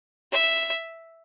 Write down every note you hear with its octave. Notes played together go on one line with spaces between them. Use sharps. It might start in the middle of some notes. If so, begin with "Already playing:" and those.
E5